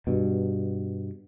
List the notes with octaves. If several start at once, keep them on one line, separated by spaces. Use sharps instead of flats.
G2 B2